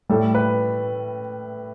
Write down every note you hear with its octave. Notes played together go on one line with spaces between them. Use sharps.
A2 G3 A4
B4